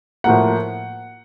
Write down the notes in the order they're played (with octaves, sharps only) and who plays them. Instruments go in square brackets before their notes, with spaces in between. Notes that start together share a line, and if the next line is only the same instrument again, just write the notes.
[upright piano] A2 F3 A#3 F#5